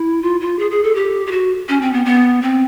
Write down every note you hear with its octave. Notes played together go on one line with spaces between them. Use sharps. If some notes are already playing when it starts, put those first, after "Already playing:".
Already playing: E4
F4
F4
G#4
G#4
A4
G4
G4
F#4
C#4
C4
B3
B3
C4